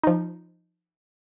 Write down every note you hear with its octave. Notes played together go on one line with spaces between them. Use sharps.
F3 D#4